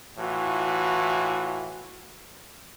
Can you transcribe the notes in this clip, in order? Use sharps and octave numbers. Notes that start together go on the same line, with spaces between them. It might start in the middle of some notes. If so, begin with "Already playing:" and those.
A2 E3 F4 F#4